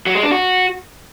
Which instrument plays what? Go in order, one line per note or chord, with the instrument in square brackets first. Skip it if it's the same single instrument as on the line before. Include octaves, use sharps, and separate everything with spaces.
[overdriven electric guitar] F#3
G#3
D4
F#4